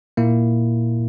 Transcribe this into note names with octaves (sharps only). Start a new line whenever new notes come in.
A#2 A#3 E4